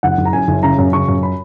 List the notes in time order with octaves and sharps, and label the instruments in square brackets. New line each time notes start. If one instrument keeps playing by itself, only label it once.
[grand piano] F#1 F#5
F#1
A#5
F#2 G#5
F#1
C#3 A#5
F#2
C#3 C#6
F#2
B5